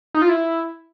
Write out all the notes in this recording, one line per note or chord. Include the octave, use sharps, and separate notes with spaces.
D#4
F4
E4